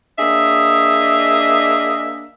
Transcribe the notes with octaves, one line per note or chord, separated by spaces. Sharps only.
A#3 D4 G#4 D#5 E5